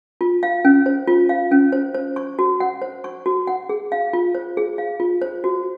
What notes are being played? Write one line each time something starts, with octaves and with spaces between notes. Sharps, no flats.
F4
F5
C#4
C5
F4
F5
C#4
C5
C5
C#6
F#4
F#5
C5
C#6
F#4
F#5
G#4
F5
F4
C5
G#4
F5
F4
C5
F#4